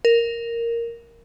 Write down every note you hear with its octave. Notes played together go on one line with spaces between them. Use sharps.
A#4